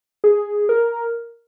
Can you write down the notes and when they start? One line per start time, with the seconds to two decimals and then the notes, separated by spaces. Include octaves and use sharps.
0.24 G#4
0.69 A#4